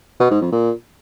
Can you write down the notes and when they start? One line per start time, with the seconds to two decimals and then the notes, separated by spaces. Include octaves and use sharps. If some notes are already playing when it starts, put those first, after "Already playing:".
0.20 B2
0.31 G#2
0.42 F2
0.52 A#2